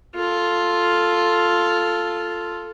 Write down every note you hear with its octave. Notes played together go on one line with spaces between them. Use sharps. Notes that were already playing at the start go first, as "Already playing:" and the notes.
F4 A4